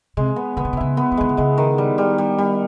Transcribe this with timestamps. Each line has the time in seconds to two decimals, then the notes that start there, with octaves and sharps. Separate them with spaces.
0.17 C3 G#3
0.36 B3
0.57 D3 B3
0.65 C#3
0.73 C3
0.77 C#3 E4
0.97 B3
1.12 E3
1.17 D#3 G#3
1.29 D3
1.37 C#3 G#3
1.58 D#3
1.78 G3
1.98 G3
2.18 G3
2.38 G3